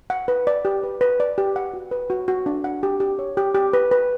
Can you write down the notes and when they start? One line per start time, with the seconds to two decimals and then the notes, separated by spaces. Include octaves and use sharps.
0.10 F#5
0.28 B4
0.47 D5
0.65 G4
0.84 B4
1.01 B4
1.20 D5
1.38 G4
1.56 F#5
1.74 F#4
1.91 B4
2.10 F#4
2.28 F#4
2.46 D4
2.64 F#5
2.83 G4
3.00 G4
3.19 C#5
3.37 G4
3.55 G4
3.73 B4
3.91 B4